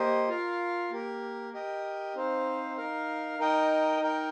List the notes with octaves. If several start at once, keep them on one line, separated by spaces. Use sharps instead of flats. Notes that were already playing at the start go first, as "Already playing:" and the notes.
Already playing: A#3 G4 C5 D#5
F4 A#4 F5
A#3 G4 A#4
G4 A#4 D#5 G5
C4 D#4 C5 F5
D#4 A#4 F5
D#4 A#4 D#5 G5
D#4 A#4 G5